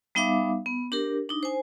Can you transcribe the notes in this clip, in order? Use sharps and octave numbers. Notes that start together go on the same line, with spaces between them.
G3 B3 D#4 E5 F5 D6
B3
D4 G4 A#4
D4 D#4
C5 G#5